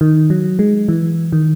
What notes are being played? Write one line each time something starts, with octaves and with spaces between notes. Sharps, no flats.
D#3
F#3
G#3
E3
D#3